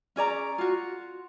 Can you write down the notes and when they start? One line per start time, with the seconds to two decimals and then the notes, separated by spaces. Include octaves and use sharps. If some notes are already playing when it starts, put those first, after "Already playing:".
0.16 C#4 G#4 D5 A#5
0.58 F4 F#4